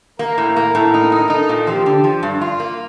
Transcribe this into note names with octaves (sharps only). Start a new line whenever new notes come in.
A#3 A#4
A2
A#3
A2
D#4
D#4
D#4 A4
A#2
F3 G4
D3
F3
G2
F4
A#3